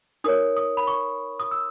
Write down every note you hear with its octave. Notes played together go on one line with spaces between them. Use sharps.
D#4 A#4 C#5 D#6
D#6
B5
C#6
D#6
E6